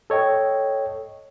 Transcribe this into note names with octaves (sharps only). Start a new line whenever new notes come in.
A4 C#5 D#5 G5